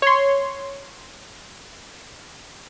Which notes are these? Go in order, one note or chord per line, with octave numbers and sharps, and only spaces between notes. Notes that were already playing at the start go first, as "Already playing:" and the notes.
C#5 C6